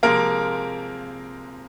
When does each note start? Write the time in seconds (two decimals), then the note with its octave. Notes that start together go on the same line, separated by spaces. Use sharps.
0.03 C3 F3 G#3 A#3 A#4